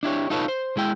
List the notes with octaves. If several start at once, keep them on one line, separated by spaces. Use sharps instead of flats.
D4 E4 G4 C#5
D#4 F4 A4 B4 C#5
C5
G#3 E4 G5